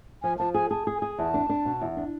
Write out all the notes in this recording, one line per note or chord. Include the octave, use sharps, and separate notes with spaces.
F3 G#5
F3 A5
G#4 G#5
G#4 A5
G#4
G#5
G#4
E2 A5
D4
D4
B2
E2
D4